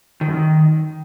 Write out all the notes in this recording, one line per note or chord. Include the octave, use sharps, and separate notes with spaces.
D#3
F#2
D#3